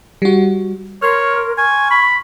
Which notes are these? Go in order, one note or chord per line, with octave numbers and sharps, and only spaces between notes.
G3 F#4
A#4 C#5 C6 F6
G#5 C#6
B5